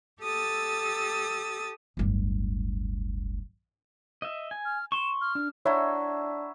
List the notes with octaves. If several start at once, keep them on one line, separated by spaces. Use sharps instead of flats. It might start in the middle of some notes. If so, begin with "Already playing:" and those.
G4 A4 D#6 E6 A6
D1 G1
D#5 E5
G#5
F6
C6 C#6 E7
F6
D4
D4 E4 C#5 F#5 A#5 C#6